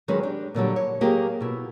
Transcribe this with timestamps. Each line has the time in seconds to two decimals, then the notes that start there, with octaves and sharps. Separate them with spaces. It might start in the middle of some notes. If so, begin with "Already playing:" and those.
0.08 D#3 F#3 G#3 C#4 G#4 B4
0.23 D4 G4
0.55 A#2 D3 F#3 G3
0.76 C#5
1.01 F#3 A#3 G4 G#4 A#4
1.41 B2 E4